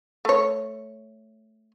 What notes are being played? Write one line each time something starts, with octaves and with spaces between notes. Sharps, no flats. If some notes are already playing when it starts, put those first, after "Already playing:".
A3 C#5